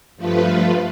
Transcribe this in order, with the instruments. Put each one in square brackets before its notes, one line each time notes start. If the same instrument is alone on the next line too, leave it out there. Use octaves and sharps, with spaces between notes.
[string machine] G2 F3 A3 F4 B4